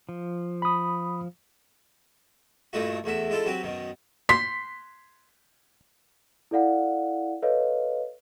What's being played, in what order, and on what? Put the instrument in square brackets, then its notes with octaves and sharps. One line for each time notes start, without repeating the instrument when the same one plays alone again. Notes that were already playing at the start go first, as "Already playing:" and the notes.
[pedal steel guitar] F3
[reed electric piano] B5 D#6
[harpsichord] G2 A#2 A3 D#4 E4 F#4
E2 A2 F#4 E5
G#3 D4 E4 F4 A4
F#3 C4 F#4 G4
F#2 B2 D#3
[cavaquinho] C6 [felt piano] B6
[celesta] E4 A4 D5 F5 F#5
A4 B4 C#5 D#5 F5